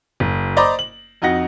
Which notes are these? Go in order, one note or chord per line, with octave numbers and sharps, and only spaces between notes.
F#1
C5 D5 D#5 A#5 B5 D6
F#7
F2 D#4 F#4 F#5 A#6